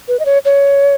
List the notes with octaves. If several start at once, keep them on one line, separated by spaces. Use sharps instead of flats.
B4
D#5
C#5
C#5